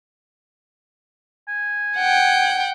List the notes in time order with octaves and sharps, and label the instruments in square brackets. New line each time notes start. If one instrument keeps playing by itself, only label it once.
[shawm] G#5
[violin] F#5 G5